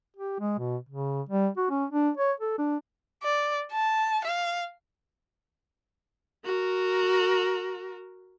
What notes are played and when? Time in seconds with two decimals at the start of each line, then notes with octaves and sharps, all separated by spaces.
0.16 G4
0.40 G#3
0.58 B2
0.89 C#3
1.29 G3
1.57 F#4
1.70 C#4
1.90 D4
2.17 C#5
2.40 A4
2.58 D4
3.23 D5
3.72 A5
4.24 F5
6.45 F#4 A#4